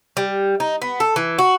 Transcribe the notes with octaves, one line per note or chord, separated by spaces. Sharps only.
G3
D#4
B3
A4
E3
F#4